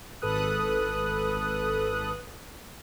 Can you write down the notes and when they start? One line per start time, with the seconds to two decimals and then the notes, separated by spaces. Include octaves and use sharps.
0.22 G#1 A4 B4 D#6 F#6